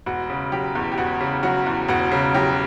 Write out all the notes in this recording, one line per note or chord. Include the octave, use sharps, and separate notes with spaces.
E1 F#4
C#3
F#3 G4
E2
G4
E1 F#4
C#3
F#3 F#4
E2
E1 F#4
C#3
F#3 G4